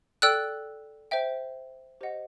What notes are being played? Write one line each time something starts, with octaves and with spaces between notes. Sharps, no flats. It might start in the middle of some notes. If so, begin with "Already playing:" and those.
A4 D5 G5 E6 F#6
C5 E5 G5
G4 C5 D#5 F#5